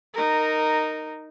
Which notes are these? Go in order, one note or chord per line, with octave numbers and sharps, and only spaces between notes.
D#4 A#4